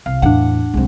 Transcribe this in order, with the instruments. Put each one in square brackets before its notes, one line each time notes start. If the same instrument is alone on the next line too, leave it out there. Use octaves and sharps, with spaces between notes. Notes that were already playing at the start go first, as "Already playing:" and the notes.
[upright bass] C2 [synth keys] F5
[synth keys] E2 A2 [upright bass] E3 [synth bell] D4 F#5
[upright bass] C2 F#3 [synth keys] G#3 C4